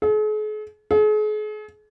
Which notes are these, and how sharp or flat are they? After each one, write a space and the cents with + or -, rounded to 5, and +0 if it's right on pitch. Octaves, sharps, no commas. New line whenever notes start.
G#4 +45
G#4 +40